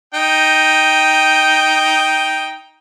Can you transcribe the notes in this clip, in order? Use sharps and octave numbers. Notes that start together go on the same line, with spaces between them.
D#4 G5